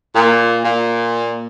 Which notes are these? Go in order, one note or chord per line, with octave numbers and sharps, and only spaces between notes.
A#2
A#2